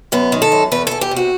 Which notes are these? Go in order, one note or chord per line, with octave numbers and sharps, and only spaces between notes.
F#2 B3
D#3
A4
F#2
E2 B4
E2 A4
G4
C3
F#4